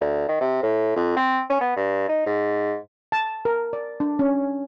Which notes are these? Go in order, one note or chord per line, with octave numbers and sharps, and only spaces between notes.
D2
D#3
C3
A2
F2
C4
C#4
B3
G2
D#4
G#2
A5
A#4
D5
D4
C#4